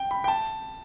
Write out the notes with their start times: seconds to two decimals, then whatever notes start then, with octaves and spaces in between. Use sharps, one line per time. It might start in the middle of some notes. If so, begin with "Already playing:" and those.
Already playing: G5
0.11 B5
0.24 G5
0.28 A5